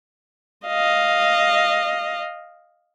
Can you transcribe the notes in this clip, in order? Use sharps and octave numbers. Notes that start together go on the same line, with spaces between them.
D#5 F5